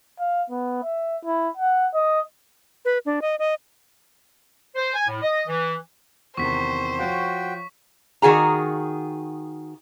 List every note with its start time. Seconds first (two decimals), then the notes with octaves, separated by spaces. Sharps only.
0.20 F5
0.50 B3
0.83 E5
1.25 E4
1.57 F#5
1.94 D#5
2.85 B4
3.06 D4
3.22 D#5
3.39 D#5
4.76 C5
4.94 G#5
5.08 A2
5.22 D#5
5.48 E3
6.37 E2 C3 D#3 C5 C#6 B6
6.99 F3 F#4 C#5 F5 G5
8.22 D#3 F#4 G#4 A#5